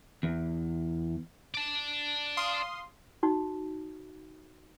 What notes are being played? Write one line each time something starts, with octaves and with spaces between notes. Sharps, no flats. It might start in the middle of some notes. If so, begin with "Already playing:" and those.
E2
D5 A5
F5 C6 D#6
D#4 F#4